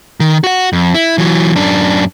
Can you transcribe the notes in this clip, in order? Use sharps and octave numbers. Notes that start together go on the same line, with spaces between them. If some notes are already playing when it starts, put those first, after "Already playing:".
D#3
F#4 F#5
F2
E4
E3 F#3
F#2 D4